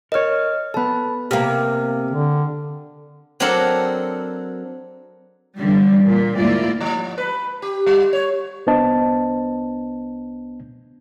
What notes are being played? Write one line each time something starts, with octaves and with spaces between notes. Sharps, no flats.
A#4 C#5 D#5 F6
B3 A4 A5 B5
C3 A#3 G5 F6
D3
F#3 C4 D4 A4 A#4 F#5
D3 E3 G3
A#2
D2 G#2 A#3 E4 F4 D5
F3
B4
G4
G3
C#5
C2 B3 D4 C5 D#5 A5